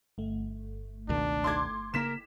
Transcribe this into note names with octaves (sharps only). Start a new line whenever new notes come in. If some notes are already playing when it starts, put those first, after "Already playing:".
G1 A3
C#2 B2 D#3 D4
C6 D6 G#6
C#3 A#3 A#4 B6 E7